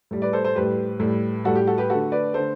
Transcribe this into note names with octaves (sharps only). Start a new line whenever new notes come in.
A2 G3
B4 D5
A4 C5
A4 C5
A2 G3 G4 B4
A2 G3
A2 G3 F#4 A4
G4
F#4 A4
G4 B4
D3 A3 F#4 A4
B4 D5
D3 A3 A4 C5